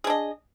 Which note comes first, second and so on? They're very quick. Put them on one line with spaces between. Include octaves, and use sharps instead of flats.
G#4 D4 D#5